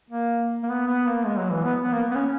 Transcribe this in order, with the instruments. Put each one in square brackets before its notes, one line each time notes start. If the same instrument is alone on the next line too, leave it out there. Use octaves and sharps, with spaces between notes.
[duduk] A#3
A#3
B3
B3
A#3
G#3
F#3
E3
B3
B3
A#3
B3
C#4